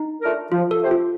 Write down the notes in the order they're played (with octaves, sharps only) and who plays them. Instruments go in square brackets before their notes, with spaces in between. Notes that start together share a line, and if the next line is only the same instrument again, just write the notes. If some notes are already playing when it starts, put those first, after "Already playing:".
Already playing: [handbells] D#4
[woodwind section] A3 D4 F4 A#4
[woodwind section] F3 [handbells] F4
[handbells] A4
[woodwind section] A3 C4 G4 C5
[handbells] F4